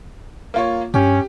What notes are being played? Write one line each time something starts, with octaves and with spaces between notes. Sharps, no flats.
A#3 F4 C#5
G2 C#4 G4